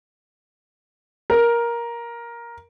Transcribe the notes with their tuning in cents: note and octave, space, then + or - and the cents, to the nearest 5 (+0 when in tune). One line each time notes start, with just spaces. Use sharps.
A#4 +10